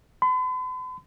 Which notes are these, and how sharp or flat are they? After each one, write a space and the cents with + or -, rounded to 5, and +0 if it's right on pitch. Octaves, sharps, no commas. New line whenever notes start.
B5 +45